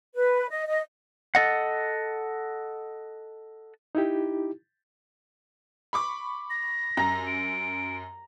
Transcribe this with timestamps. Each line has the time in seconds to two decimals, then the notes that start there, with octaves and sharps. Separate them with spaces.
0.15 B4
0.50 D#5
0.68 D#5
1.35 A4 D#5 F#5
3.95 D#4 E4 G4
5.93 B5 C#6 D6
6.50 A#6
6.97 F#2 A#5
7.27 D7